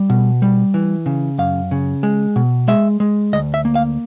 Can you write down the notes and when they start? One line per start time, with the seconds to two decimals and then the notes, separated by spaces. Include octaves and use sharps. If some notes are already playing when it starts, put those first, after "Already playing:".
Already playing: G3
0.10 B2
0.42 G3
0.74 E3
1.06 C#3
1.38 F#2 F5
1.71 C#3
2.03 G#3
2.36 B2
2.68 G#3 E5
3.00 G#3
3.33 D2 D#5
3.54 E5
3.65 A#3
3.75 F5